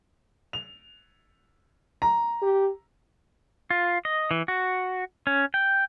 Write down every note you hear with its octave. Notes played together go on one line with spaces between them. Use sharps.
F7
A#5
G4
F4
D#5
E3
F#4
C#4
G5